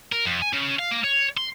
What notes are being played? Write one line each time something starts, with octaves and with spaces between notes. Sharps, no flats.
A#4
F2
G#5
C#3
F5
A#3
C#5
C6